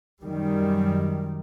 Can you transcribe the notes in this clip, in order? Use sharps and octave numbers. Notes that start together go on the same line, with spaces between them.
F#2 D#3 G3